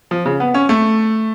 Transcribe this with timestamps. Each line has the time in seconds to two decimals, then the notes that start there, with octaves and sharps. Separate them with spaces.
0.11 F3
0.26 C#3
0.40 B3
0.54 C#4
0.69 A3